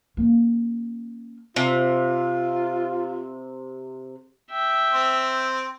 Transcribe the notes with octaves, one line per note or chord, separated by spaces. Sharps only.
A#3 C#4
C3 F4
E5 G5
C4